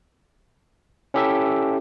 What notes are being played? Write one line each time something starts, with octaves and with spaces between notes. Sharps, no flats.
C#4 E4 G4 A4 E5